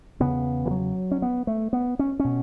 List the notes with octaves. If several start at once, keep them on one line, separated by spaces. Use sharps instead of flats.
E2 C#3 B3
E3
F#3
C#4
B3
A3
B3
C#4
B2 C#4